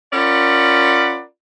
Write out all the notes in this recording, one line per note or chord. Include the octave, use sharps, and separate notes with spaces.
C#4 F4 A#4 D5 F#5 B5